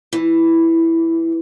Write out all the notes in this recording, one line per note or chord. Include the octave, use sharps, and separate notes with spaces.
E3